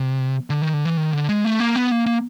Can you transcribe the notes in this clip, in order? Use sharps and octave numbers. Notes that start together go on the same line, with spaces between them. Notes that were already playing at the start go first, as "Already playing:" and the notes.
Already playing: C3
D3
D#3
D3
E3
D#3
D3
G#3
A3
A#3
B3
A#3
A#3